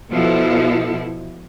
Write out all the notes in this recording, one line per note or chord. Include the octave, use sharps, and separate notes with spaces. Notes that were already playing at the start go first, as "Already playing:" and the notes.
B2 F3 E4 A4